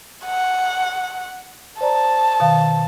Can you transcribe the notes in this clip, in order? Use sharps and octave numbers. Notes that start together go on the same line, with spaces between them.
F#5
C5 D5 A5 A#5
B2 D#3 F5